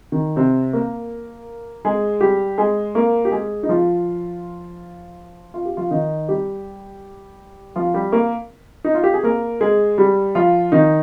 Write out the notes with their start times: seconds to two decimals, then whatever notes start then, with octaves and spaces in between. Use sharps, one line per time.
0.12 D#3
0.36 C3 C4
0.73 A#3 A#4
1.85 G#3 G#4
2.21 G3 G4
2.58 G#3 G#4
2.95 A#3 A#4
3.25 G4
3.32 G#3 G#4
3.63 D#4
3.69 F3 F4
5.54 F4
5.66 G4
5.77 F3 F4
5.91 D#3 D#4
6.29 G3 G4
7.76 F3 F4
7.94 G3 G4
8.12 A#3 A#4
8.84 D#4
8.95 F4
9.04 G4
9.13 G#4
9.23 A#3 A#4
9.61 G#3 G#4
9.98 G3 G4
10.35 F3 F4
10.72 D#3 D#4